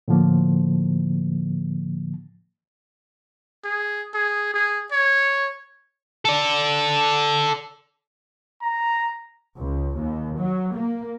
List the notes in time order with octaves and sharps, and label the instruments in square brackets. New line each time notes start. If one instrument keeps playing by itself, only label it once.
[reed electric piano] A2 D3 F3 A#3
[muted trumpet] G#4
G#4
G#4
C#5
[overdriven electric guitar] A4 D5
[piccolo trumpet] A#5
[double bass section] C#2
D#2
F#3
A#3